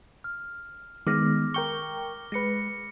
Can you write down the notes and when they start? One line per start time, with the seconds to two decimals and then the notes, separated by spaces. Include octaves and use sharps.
0.24 F6
1.07 D#3 G#3 B3 D6 F6 A#6
1.54 A#4 G5 C#6 G7
2.32 G#3 B4 A#6 C#7